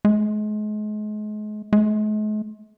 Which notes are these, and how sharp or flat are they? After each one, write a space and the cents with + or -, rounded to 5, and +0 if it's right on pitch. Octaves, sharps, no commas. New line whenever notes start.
G#3 +35
G#3 +45